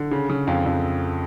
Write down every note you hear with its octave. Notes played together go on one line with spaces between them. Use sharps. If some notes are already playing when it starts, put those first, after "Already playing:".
Already playing: D3
C#3
C#3
F2 F5
F2